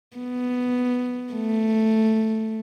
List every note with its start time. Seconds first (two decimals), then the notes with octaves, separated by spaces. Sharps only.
0.17 B3
1.33 A3